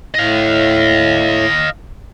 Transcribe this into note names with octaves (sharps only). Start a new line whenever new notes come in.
A2 D#5 F5